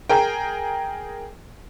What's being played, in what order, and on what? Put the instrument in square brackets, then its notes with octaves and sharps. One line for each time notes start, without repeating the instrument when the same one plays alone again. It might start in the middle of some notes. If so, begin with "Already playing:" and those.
[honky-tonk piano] G#4 A#4 G5